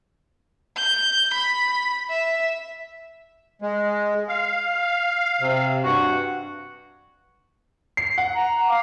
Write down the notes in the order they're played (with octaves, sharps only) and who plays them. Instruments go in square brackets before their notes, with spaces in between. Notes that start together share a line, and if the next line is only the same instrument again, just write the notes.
[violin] G6
B5
E5
[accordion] G#3
F5
[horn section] C3
G2 F#4
[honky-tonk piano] C7
F#5
[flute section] A#5
F5 D6